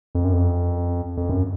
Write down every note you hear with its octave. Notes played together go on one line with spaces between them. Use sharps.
F2
F#2
F2
F2
F#2